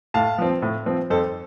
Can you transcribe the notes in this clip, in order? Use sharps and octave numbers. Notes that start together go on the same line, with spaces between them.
A2 F5 A5
F3 C4
A2
F3 C4
F2 A4 C5